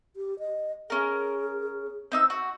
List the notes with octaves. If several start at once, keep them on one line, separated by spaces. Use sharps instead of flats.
G4
D#5
C#4 G#4 A#4
C4 D#4 E6
F#4